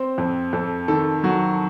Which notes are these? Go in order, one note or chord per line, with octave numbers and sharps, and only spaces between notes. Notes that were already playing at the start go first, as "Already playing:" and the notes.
Already playing: C4 C5
F2
F2 A4
D#3 A4
F#3 F#4